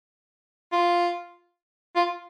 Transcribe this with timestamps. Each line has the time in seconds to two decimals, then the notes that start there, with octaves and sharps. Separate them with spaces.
0.72 F4
1.96 F4